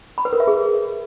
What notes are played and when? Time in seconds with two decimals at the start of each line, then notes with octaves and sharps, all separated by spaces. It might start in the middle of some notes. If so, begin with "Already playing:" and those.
0.18 B5
0.25 B4
0.33 A#4
0.40 E5
0.47 G#4